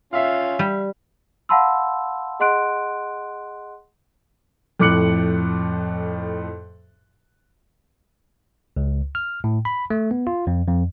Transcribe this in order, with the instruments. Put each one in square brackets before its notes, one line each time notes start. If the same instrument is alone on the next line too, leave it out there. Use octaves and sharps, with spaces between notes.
[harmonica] C#4 F4 [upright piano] E5 F5
[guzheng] G3
[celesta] F5 F#5 A5 B5 C6 E6
G#4 D#5 F#5 C6 F#6 D7
[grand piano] F2 A2 D6 F#6 C#7 F#7
[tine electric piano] C#2
F6
A2
B5
A3
B3
F4
F2
F2